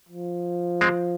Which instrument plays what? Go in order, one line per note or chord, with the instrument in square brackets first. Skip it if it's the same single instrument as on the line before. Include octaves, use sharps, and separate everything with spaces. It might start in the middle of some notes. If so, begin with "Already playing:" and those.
[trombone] F3
[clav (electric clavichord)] G#3 C4